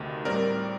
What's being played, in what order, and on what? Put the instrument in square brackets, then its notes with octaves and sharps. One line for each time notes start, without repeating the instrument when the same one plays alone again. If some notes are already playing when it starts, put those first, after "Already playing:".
Already playing: [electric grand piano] D2 C3 D#3
A2 G3 C4 A#4 D5